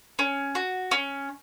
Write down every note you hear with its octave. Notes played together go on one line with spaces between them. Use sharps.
C#4
F#4
C#4